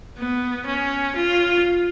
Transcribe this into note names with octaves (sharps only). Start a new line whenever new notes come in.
B3
C#4
F4